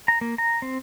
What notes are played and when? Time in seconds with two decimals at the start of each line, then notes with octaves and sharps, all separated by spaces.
0.08 A#5
0.21 A#3
0.38 A#5
0.62 C4